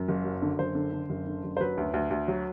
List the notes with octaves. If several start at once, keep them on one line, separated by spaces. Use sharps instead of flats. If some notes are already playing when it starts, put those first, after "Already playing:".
Already playing: F#2
F#1
F#3
D3
F#1 C5
D3
D3
F#1
D3
F#1
C5
F#3 B4
D2
D2
D2
F#3